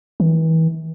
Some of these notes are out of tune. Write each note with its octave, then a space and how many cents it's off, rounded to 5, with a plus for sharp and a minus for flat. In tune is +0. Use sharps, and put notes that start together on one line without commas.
E3 -35